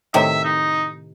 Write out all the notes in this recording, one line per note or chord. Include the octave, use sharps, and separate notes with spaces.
A2 C3 D#3 E5
D#4